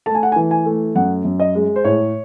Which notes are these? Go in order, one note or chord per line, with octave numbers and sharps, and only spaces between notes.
A3 A5
G#5
F#5
G#5
E3
G#5
A3
F#2 F#5
F#2
D#5
G#3
C5
A2 C#5